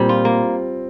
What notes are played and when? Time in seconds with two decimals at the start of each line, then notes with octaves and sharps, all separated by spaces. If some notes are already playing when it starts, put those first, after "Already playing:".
Already playing: A#2 G3 C4
0.09 F4
0.25 A#3